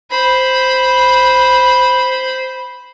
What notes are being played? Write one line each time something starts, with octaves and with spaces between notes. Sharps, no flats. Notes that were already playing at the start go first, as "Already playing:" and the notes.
C5 B5